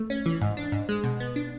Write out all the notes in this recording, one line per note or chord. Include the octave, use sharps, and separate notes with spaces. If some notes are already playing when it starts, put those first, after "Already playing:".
Already playing: A3
C#4
E3
G#2
D4
G#2
G#3
B2
B3
D4